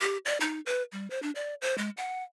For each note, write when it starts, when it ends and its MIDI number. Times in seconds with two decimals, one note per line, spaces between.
0.01 0.17 67
0.25 0.38 74
0.40 0.60 63
0.66 0.82 71
0.92 1.09 55
1.10 1.21 72
1.22 1.31 62
1.35 1.54 74
1.62 1.77 72
1.78 1.90 56
1.97 2.23 78